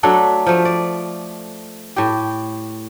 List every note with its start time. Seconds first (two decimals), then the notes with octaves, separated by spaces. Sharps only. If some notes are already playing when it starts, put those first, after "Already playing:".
0.03 F#3 A3 D4 A4
0.46 F3 A3
0.65 D5
1.96 A2 G4